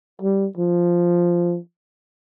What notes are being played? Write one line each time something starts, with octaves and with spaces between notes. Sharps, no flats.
G3
F3